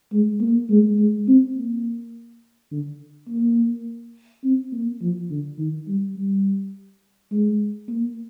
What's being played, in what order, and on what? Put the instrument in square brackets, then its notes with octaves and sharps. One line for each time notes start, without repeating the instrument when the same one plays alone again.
[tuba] G#3
A#3
G#3
G#3
C4
A#3
D3
A#3
C4
A#3
F3
D3
D#3
G3
G3
G#3
A#3